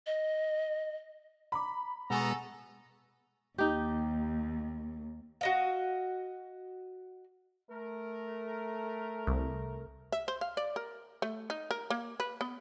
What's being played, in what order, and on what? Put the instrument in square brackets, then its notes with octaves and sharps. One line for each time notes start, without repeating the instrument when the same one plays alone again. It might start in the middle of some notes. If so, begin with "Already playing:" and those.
[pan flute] D#5
[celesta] A#5 D6 [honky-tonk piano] B5
[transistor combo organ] B2 G#3 [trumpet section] B3 A4 A#5 [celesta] F#5 G#5 C#6
[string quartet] D#2 [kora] D#4 G4
[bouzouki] F#4 D#5 F5
[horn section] A3 A#4
[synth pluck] C2
[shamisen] E5
C5
F5
D5
A#4
A3
D#4
A#4
A#3
B4
B3